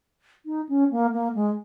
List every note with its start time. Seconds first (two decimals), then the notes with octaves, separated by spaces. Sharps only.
0.46 D#4
0.69 C#4
0.91 A#3
1.13 A#3
1.35 G#3